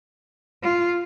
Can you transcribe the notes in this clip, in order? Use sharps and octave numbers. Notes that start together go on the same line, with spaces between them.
F4